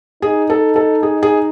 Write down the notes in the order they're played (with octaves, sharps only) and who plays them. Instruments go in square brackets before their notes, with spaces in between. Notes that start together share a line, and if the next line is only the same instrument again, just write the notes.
[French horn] D#4 [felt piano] G#4
[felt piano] A4
A4
G#4
G#4